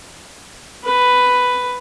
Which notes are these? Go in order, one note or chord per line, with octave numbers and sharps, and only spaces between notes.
B4